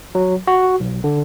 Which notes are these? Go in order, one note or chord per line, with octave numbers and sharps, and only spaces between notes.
F#3
F#4
B1
D3